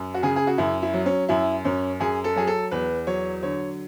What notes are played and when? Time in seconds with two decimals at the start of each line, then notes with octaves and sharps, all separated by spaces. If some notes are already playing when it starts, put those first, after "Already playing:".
Already playing: F#2
0.14 F#4
0.23 C#3 G#4
0.36 G#4
0.47 F#4
0.58 F#2 E4
0.82 E4
0.94 F#3
1.06 C#4
1.29 F#2 E4
1.65 F#2 C#4
2.00 F#2 G#4
2.24 A4
2.36 F#3 G#4
2.47 A4
2.71 E2 B4
3.07 F#3 C#5
3.43 D3 C#5